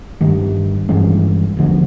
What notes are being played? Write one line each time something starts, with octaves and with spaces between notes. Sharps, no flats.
G2 D#3 G3
G2 E3 G#3 C#4
D#2 D3 F3